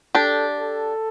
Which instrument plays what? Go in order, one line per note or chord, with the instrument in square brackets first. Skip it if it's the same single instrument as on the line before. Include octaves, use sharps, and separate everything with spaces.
[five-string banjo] D4 G4 [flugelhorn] A4
[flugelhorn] A4